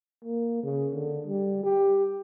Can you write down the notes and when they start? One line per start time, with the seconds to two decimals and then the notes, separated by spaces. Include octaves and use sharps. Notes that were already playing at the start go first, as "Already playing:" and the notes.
0.25 A#3
0.63 C#3
0.93 D3
1.27 G3
1.63 G4